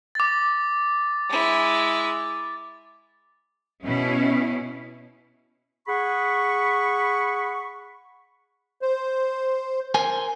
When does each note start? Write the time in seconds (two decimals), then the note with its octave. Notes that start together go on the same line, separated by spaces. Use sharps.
0.15 D6 A6
1.29 G#3 E4
3.83 B2 C#4 E4
5.87 G#4 F#5 B5 C#6
8.82 C5
9.94 A#4 C5 G#5